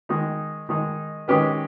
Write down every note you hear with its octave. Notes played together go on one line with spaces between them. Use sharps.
D#3 G#3 D#4
D#3 G#3 D#4
D#3 G#3 C#4 G4 B4